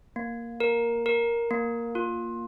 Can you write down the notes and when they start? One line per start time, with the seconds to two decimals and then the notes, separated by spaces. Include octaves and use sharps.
0.16 A#3
0.60 A#4
1.06 A#4
1.51 A#3
1.95 F4